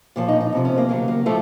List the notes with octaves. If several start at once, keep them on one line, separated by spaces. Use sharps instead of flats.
A#2 F3 C#5
D#4
D#4
F2 C3 F3
C#4
A#3
D#2 C#3 F#3 A#3
A#3
A2 F3 A3